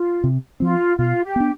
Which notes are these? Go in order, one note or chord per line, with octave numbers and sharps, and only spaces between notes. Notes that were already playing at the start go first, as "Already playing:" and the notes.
Already playing: F4
C3
F3 C4 F4
B2 F4
G4
B3 D4